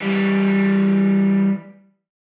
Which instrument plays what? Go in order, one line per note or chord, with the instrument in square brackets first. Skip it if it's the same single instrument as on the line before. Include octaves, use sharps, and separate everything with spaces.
[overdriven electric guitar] E3 G3